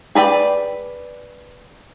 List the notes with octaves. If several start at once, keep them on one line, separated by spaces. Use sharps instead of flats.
G#4 B4 D5 G5